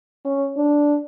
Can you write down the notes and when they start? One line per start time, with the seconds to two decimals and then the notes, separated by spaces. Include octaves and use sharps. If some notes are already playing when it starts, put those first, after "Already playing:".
0.25 C#4
0.57 D4